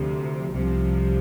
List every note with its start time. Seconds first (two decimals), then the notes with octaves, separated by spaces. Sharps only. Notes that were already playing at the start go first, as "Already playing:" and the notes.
Already playing: D2 C3 F3
0.53 C2 C3 F3